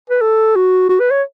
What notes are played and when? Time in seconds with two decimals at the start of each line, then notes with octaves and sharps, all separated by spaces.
0.10 B4
0.21 A4
0.56 F#4
0.89 F#4
1.00 B4
1.11 C#5